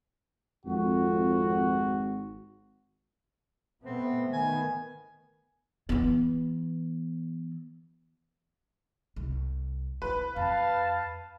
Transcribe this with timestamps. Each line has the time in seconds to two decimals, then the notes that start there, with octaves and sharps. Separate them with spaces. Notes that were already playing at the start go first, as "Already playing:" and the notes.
0.65 G#1 F2 F#4
3.84 B2 A3 B3 C4
4.33 D#3 B3 G#5
5.89 E3 B3
9.16 C2
10.02 E4 B4
10.36 F2 F5 A5